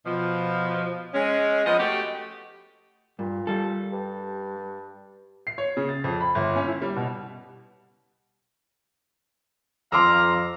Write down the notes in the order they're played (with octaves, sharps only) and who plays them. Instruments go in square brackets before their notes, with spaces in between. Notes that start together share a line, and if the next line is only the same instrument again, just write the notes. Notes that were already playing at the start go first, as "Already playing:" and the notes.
[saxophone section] B2 F3
G#3 C#4
F3 B3 D#5
A3 F#4 G4
[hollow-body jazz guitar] G2 [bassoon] A#2
[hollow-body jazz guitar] G3 A4
[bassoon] G2
[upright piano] C7
C#5
C#3
A6
F2
B5
G1
C#4
E4
G3
B2
[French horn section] F2 [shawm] F5 [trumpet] A#5 [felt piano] C6 D6 E6